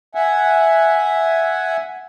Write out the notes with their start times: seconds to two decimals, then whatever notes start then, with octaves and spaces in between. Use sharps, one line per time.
0.15 E5 F#5 G#5